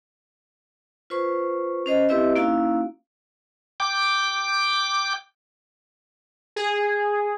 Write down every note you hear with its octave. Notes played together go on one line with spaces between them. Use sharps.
F4 B4 C5 C#6
C#4 C5 D#5
C4 E4 G4 B4 D#5 E5
A#3 C#4 D#4 E4 F#4 F5
G5 D6
G#4